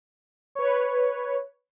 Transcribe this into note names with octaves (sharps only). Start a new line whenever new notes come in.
B4 C#5